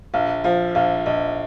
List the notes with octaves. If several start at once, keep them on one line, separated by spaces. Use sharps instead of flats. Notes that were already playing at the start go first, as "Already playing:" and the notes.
A#1 F5
F3 F5
A#1 F5
A#1 D#5